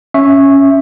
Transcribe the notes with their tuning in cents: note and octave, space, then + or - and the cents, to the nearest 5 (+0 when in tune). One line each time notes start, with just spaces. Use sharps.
C#4 +0 E5 +0 C#6 -10